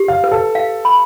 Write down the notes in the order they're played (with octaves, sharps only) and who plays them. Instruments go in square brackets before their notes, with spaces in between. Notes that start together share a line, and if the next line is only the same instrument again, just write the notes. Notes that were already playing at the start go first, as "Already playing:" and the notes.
Already playing: [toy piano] G4
[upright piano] F5
[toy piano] B4
[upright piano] A4
[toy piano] F5
B5